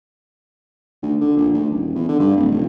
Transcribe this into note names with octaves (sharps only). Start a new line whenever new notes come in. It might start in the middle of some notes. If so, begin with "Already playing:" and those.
D2
D3
A#1
D2
D#1
E2
D3
G2
D1
F1